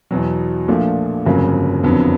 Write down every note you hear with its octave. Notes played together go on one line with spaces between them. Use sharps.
E2 B2 F#3
A#1 A#2 F3 A3 D4
G1 F2 C#3 F#3 A#3
F#1 F2 D3 F#3 B3